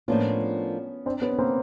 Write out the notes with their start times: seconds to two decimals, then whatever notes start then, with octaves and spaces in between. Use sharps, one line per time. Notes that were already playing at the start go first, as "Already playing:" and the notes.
0.08 A2 F3 A#3 B3 C#4 D4 F4
1.06 C4 D4
1.22 B3 C#4
1.38 A#3 C4